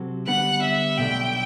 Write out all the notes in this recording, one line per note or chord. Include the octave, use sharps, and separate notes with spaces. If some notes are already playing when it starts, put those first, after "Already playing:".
Already playing: C3 F#3 C4 F#4 A4
D3 G3 B3 F#5
E5
B1 B2 A3 D4 G5